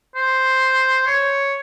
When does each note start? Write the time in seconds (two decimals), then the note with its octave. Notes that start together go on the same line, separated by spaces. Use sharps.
0.16 C5
1.07 C#5